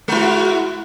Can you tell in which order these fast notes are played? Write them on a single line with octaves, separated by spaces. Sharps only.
G#3 E4 F#4